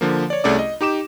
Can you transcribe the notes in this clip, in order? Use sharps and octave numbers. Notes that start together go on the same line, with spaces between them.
D3 F3 A#3
C#5 D5
C2 A3 C#4 G#4 D5 D6
D#5
D#4 G4 D6 E7